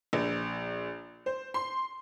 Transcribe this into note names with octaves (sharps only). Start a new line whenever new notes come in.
A#1
C5
C6